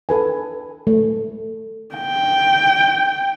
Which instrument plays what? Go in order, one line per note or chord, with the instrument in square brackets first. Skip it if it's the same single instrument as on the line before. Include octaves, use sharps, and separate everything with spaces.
[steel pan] A4 B4 G#5
A3
[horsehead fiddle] G5